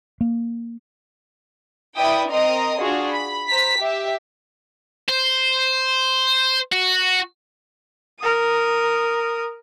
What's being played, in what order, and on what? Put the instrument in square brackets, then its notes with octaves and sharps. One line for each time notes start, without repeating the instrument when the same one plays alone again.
[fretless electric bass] A#3
[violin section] E4 B4 D5 E5 G5 D#6
C4 A#4 D#5 A#5 C6 D#6
D4 F4 F#4 G#4
B5
C5 A#5 B6
G4 E5
[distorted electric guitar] C5
F#4
[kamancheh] A#4 D#6